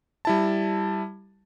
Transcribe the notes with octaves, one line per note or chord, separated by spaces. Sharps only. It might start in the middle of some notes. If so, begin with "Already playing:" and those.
G3 E4 A5